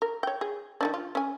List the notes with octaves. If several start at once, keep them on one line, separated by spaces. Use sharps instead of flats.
A#4
C#5 G5
G#4
D#3 C#4 D4
F4
C#4 G#5